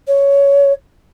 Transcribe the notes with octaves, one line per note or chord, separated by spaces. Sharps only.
C#5